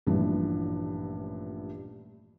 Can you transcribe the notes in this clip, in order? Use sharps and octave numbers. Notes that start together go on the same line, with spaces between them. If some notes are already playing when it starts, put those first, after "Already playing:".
A1 G2 A#2 E3 F3 G3